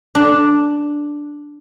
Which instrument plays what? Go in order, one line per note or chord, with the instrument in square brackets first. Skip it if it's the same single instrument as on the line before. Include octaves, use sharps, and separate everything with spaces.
[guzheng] D4